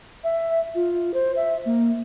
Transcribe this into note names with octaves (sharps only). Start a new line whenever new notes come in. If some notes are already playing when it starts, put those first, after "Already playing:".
E5
F4
C5
E5
A#3